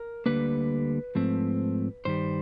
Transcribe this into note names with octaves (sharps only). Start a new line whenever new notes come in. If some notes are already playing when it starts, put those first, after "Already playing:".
Already playing: A#4
D2 D3 G3 A#3 B4
G#2 F3 A3 C4
G2 D#3 G3 C5